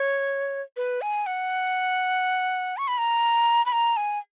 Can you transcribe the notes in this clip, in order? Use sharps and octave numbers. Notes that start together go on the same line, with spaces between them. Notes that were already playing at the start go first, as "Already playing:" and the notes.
Already playing: C#5
B4
G#5
F#5
C#6
B5
A#5
B5
A#5
G#5